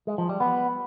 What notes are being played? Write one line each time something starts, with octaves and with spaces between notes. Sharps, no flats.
G#3
F3
G3
B3